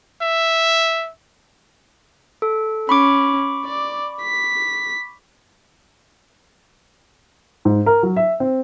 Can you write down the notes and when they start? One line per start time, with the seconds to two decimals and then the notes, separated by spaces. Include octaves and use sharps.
0.21 E5
2.42 A4
2.89 C#4 B5 C#6 D6
3.65 D5
4.22 B6
7.65 G#2
7.86 A#4
8.03 F#3
8.16 E5
8.40 C4